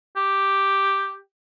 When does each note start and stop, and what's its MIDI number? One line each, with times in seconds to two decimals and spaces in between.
0.16 1.18 67